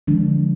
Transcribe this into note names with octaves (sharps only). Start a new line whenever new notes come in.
D3 F3 G#3 D4